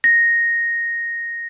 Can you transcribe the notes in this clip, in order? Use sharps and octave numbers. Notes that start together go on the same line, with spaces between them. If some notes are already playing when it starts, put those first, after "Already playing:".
A#6